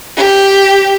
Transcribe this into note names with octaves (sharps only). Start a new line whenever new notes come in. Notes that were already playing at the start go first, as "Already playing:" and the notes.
G4